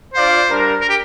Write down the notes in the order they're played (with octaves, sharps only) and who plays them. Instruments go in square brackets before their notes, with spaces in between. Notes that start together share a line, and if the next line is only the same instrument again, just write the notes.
[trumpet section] D4 F4 D5 F5 [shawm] C5
[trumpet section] G3 D4 A#4
[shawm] A#4
G4